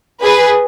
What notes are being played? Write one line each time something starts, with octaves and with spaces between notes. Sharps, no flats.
G#4 B4